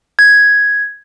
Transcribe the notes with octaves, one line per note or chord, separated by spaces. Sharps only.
G#6